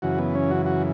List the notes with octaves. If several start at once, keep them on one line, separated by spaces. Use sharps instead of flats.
F#2 C#3 E3 F#4
B3
C#4
F#4
F#4